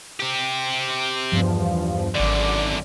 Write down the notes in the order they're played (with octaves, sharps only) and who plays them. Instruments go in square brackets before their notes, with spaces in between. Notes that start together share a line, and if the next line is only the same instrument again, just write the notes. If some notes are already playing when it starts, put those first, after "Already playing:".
[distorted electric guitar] C4 G4
[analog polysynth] E2 G2 F3
[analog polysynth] G#1 D5 [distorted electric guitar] F#2 D3